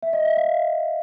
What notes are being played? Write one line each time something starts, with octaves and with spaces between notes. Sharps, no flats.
E5
D#5
E5
F5